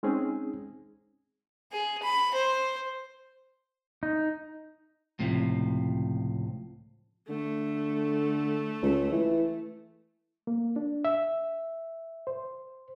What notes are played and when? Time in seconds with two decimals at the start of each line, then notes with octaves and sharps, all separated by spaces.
0.03 G#3 C4 C#4 D#4 G#4
1.72 G#4
2.03 B5
2.34 C5
4.03 D#4
5.19 C#2 A2 C3 F3
7.29 D3 A3
8.83 C#2
9.12 E3
10.47 A#3
10.76 D4
11.05 E5
12.27 C5